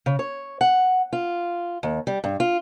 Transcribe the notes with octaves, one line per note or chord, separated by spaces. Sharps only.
C#3
C#5
F#5
F4
D#2
G3
G2
F4